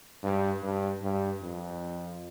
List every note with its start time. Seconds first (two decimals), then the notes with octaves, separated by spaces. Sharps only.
0.23 G2
0.63 G2
1.02 G2
1.42 F2